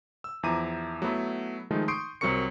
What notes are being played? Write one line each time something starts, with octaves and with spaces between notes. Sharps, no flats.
E6
E2 F3 E4 A#5 D6 D#7
F#3 A3 B3 E4
D#3 F3 G#3 A3 D#4
C6 C#6 D#6 G6 C7 D7
C2 F#3 C4 A#4 C#6 C#7